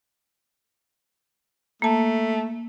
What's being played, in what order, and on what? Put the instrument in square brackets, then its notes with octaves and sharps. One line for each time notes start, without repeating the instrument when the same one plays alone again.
[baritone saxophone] A3 [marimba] A#3 A5